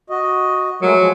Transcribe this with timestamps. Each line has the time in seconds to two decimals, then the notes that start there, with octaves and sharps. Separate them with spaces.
0.10 F#4 D#5
0.82 F#3 G#3 A3 A#4
0.96 F3 G#3